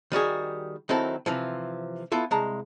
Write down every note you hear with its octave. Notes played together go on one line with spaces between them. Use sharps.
D#3 G3 F#4 G#4
D#3 F#3 C4 E4 A4
C3 E3 F3
B3 E4 F4 A4
C2 G#3 A5 A#5